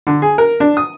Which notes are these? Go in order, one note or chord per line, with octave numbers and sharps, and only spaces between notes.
D3
G#4
A#4
D4
D#6